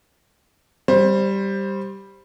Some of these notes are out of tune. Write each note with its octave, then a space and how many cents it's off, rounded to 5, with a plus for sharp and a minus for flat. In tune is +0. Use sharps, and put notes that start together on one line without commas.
G3 +0 C5 +15